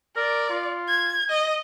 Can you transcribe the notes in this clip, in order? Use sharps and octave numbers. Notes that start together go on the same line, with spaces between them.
A#4 D5
F4
G#6
D#5